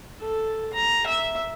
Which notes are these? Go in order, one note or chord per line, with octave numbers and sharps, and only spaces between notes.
A4
A#5
E5